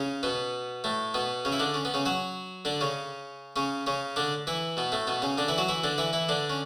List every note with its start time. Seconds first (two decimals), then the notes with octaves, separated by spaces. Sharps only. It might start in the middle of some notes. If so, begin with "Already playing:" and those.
Already playing: C#3 C#4
0.23 B2 B3
0.84 A2 A3
1.14 B2 B3
1.45 C#3 C#4
1.52 E4
1.60 D3 D4
1.74 C#4
1.85 B3
1.94 C#3 C#4
2.06 F#3 F#4
2.65 D3 D4
2.81 C#3 C#4
3.56 C#3 C#4
3.87 C#3 C#4
4.16 D3 D4
4.47 E3 E4
4.77 B2 B3
4.92 A2 A3
5.07 B2 B3
5.22 C#3 C#4
5.38 D3 D4
5.49 E3 E4
5.58 F#3 F#4
5.68 E3 E4
5.84 D3 D4
5.98 E3 E4
6.13 E3 E4
6.29 D3 D4
6.50 C#4